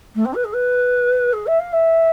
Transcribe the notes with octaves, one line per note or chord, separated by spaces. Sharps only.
A3
C4
B4
G#4
B4
G#4
E5
F5
E5